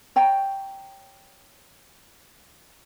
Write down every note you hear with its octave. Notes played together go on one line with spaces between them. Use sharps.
C#5 G5 A#5